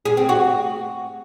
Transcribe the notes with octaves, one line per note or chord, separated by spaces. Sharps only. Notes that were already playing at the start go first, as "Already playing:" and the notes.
G#4
C4
F#4